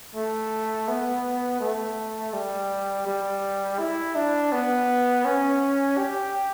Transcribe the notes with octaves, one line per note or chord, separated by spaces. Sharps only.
A3
B3
A3
G3
G3
E4
D4
B3
C#4
G4